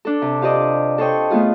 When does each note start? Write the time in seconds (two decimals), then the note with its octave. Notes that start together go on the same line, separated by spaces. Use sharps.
0.05 D4 A4
0.22 C3
0.41 F4 G4 C5 D5 D#5
0.98 A4 C5 C#5 D#5 G5
1.30 A3 B3 F4 G#4